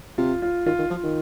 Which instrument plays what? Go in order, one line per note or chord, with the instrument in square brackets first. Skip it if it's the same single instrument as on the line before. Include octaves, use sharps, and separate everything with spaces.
[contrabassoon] C3 [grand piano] F4
[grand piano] F4
[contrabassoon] D#3 [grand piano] F4
[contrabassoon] D#3
[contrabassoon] F3 [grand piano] F4
[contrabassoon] D#3